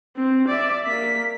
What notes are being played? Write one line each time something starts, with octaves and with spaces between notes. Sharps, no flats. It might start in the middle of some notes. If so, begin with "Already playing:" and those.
C4
D5 E5
A#3 B6